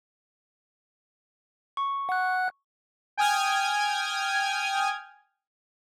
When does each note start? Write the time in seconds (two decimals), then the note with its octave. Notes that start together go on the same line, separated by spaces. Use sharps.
1.77 C#6
2.09 F#5 F#6
3.17 G5 G#5 D#6 F6 G#6